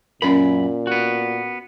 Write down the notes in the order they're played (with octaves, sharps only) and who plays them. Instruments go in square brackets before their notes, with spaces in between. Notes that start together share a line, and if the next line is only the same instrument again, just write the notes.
[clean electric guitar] F#2 B5 [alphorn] A#2 [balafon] C#4 A#4
[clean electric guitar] B3 F#4